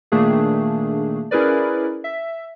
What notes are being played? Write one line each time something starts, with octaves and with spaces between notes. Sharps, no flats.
A#2 D#3 A3 A#3 D4 G#4
C#4 E4 G#4 A#4 B4 D5
E5